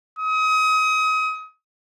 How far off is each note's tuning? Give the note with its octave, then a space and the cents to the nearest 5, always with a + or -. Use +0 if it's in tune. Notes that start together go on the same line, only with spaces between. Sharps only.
D#6 +30